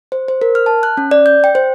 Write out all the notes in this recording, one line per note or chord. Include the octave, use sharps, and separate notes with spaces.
C5
C5
A#4
F6
A5
F#6
C#4
D5
G6
G5
C5